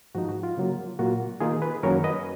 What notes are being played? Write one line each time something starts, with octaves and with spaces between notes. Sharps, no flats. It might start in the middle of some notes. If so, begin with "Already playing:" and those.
G#2 F3 G#3 D#4 F#4
F#4
F4
C#3 F#3 A#3
A#2 F#3 A#3 F4 F#4
D#3 A#3 D#4 F4 G#4
G#4 B4
F#2 D#3 F#3 A#3 C#4 A#4 C#5
B4 D#5